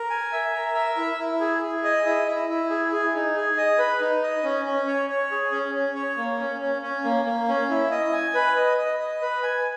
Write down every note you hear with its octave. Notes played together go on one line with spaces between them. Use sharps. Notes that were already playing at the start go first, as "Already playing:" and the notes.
Already playing: A#4
G#5
E5
A#4
E5
E4
E4
G#4
G#4
D#5
E4
E4
E4
G#4
G#4
D#4
G#4
D#5
B4
D#4
D#5
C#4
C#4
C#5
C#5
G#4
C#4
C#4
C#5
A#3
C#4
C#4
C#4
A#3
A#3
C#4
E4
D#5
G#5
B4
D#5
D#5
D#5
B4
G#5